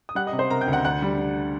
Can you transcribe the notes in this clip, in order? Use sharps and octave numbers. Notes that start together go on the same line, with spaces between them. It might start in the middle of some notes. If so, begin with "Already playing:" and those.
D#6
G3 F#5 F#6
D#5 D#6
C3
C5 C6
C3 A#4 A#5
G5 G6
D2
F#5 F#6
D2 F#5 F#6
G3
G3